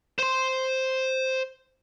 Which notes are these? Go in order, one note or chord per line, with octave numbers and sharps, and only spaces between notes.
C5 C6